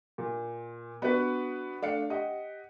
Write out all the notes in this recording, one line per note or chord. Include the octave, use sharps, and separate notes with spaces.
A#2
B3 D4 F#4 B4
A3 D4 F5 C#7
G4 D#5 F#5